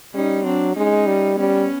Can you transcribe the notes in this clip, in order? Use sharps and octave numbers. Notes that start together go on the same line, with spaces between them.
G3 C#4 D#4
F#3 C4 D4
G#3 C#4 D#4
G3
G3 B3 C#4